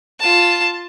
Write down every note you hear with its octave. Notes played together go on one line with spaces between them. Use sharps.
F4 A5